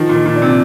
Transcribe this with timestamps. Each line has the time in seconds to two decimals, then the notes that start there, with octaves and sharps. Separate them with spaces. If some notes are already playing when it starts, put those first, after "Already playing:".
Already playing: D#3 F3
0.09 A#2
0.15 D#3
0.26 A#2
0.36 D4
0.42 C3